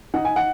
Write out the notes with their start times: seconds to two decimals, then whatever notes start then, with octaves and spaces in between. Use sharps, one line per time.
0.14 D#4 F#5
0.25 G#5
0.36 F#5